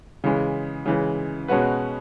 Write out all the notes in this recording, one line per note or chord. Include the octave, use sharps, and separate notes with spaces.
C#3 E3 G#3
C#3 E3 G#3
B2 G#3 C#4 F#4 B4